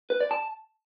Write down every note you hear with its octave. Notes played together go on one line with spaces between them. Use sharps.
B4
D5
A5